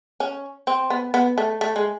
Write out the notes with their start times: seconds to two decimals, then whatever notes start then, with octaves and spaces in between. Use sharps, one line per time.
0.20 C#4
0.67 C4
0.90 B3
1.14 B3
1.38 A3
1.61 A3
1.76 G#3